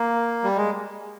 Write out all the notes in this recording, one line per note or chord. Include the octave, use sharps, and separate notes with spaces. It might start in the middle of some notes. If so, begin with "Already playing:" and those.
Already playing: A#3
G3
G#3